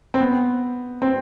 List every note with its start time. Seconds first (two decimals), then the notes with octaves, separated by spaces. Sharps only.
0.14 C4
0.21 B3
1.02 C4